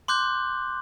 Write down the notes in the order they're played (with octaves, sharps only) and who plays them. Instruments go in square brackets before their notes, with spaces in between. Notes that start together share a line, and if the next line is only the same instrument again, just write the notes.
[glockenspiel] C6 D6 F#6 G6